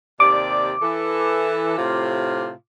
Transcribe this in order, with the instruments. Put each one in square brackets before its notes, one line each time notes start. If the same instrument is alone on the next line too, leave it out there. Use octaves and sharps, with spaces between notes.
[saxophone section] D#2 C3 D5 [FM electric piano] D6
[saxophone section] E3 A4
A2 C3 F4